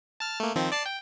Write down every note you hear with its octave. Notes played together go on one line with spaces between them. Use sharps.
A5 F6
A3 A#3
D#3 F3 C4
D5 A5 C7
G5